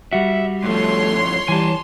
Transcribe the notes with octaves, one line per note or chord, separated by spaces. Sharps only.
G3 F#4 E5
G2 F3 A3 C#5 C6
E3 G3 G#5 A5